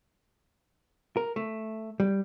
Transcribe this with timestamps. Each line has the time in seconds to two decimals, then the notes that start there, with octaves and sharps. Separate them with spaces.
1.17 A#4
1.36 A3
2.00 G3